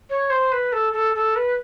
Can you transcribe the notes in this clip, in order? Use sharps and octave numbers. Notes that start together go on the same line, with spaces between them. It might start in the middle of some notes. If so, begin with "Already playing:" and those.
C#5
C5
B4
A4
A4
A4
B4